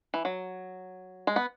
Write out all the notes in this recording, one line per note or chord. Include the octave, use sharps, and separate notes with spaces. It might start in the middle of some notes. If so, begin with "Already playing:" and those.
E3
F#3
G#3
B3